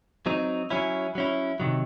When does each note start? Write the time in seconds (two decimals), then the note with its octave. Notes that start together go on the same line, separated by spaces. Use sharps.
0.26 F#3 C4 D#4
0.70 F#3 C#4 E4
1.15 F#3 C#4 E4
1.60 C3 D#3 F#3